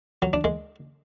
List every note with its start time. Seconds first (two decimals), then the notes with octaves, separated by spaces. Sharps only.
0.22 F#3
0.33 D4
0.44 G#3